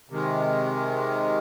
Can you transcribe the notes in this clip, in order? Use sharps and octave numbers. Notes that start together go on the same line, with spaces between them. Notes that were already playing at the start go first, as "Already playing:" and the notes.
C3 D#3 G#3